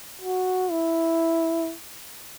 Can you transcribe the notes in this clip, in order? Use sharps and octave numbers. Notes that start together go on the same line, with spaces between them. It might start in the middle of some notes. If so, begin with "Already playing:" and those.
F#4
E4